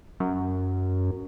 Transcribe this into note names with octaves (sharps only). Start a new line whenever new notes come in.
F#2